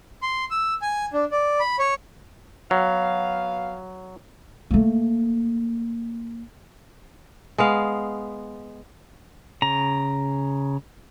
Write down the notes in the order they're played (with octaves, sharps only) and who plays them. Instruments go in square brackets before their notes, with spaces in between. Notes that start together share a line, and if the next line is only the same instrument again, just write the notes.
[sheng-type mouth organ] C6
E6
G#5
D4
D5
B5
C#5
[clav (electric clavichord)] F#3 [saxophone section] B3 F5
[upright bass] A3 A#3
[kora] G#3 B3 F5
[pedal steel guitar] C#3 A#5